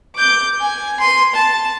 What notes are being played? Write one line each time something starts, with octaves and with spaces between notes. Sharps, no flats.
D6 G6
G#5
C6 D#7
A5